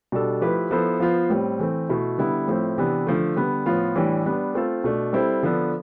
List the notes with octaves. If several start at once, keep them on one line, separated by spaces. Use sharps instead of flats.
B2 G3 D4 A4
F3 A3 E4 G4 B4
F3 B3 E4 A4 C5
F3 B3 F4 C5
A2 G3 C4
E3 A3 C4
B2 A3 E4
D3 G3 B3 E4
A2 F3 A3 C4 E4
C3 E3 B3 D4
D3 F3 A3
D3 G3 B3
A2 F3 B3 F4
A2 E3 G3 D4 G4
G3 B3 D4
A3 C4 F4 A4
B2 A3 D4
G3 C4 E4 A4 C5
D3 F3 B3 D4 A4